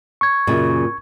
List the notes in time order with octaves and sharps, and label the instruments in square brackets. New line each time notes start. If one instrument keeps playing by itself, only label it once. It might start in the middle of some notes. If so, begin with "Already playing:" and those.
[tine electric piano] C#6 G#6
[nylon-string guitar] F#2 A#2 C#3